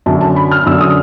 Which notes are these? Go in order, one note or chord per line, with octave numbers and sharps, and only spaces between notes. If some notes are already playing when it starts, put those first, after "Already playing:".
F#2 D3 A5
A5
B5
F6
F#2 D3 E6
D#6